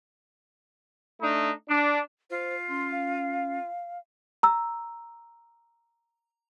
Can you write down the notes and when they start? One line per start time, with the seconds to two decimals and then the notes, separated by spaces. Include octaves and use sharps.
1.21 A3 D4 D#4
1.69 D4
2.30 F4 C5
2.69 C#4 C6
2.91 F5
4.43 A#5 E6